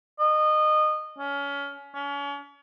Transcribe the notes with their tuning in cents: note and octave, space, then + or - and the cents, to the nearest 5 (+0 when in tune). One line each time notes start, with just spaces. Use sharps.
D#5 -25
C#4 +25
C#4 +35